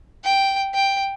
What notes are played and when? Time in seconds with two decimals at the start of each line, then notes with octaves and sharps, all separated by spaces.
0.24 G5
0.74 G5